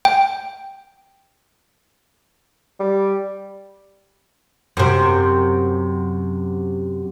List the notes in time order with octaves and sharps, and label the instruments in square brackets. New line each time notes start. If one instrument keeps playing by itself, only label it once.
[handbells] G5
[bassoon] G3
[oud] F#2 C3